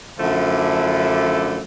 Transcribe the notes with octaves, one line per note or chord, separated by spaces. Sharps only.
F#2 D3 F3 A3 D4 E4